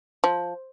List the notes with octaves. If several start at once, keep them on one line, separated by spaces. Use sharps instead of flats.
F3